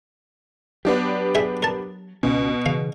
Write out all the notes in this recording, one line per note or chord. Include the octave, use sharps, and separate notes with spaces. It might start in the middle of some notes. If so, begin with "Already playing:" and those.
F#3 B3 D4 G4
G#4 E5 G5
A#4 A5
C#2 B2 C#4
C#3 E3 F5